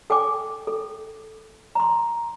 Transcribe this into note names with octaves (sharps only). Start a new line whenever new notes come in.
A4 G5 G#5 D6
A4
A#5 C6